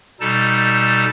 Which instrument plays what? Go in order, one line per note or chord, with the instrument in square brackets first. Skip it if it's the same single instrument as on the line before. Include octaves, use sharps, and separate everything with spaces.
[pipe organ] B2 G3 D#4 A4 A5 A6